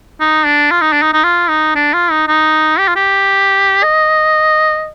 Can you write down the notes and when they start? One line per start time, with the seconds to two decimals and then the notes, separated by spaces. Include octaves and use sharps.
0.20 D#4
0.46 D4
0.72 F4
0.82 D#4
0.93 D4
1.02 D#4
1.14 D#4
1.24 F4
1.49 D#4
1.76 D4
1.94 F4
2.11 D#4
2.28 D#4
2.79 G4
2.88 F4
2.96 G4
3.83 D#5